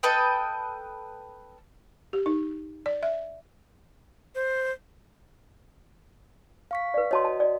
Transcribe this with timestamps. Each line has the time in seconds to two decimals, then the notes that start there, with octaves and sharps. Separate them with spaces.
0.03 A4 B4 D#5 G5
2.13 G4
2.26 D#4
2.86 D5
3.03 E5
4.35 C5
6.71 F5 C#6 B6
6.94 B4 D5
7.11 F#4 C#5 D#5 A5 C6
7.25 A5
7.40 D5